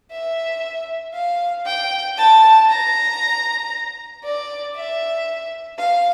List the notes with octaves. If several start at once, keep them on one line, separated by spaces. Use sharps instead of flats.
E5
F5
G5
A5
A#5
D5
E5
F5